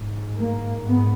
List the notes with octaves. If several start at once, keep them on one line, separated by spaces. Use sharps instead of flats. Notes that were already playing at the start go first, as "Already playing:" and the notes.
Already playing: G#2
A#3
G#2 B3